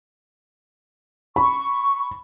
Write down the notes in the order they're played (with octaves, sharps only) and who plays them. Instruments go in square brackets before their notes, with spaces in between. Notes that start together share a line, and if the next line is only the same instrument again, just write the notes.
[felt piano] B5 [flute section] C#6